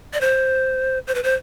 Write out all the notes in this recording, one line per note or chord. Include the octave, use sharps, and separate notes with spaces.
D5
C5
C5
B4
C5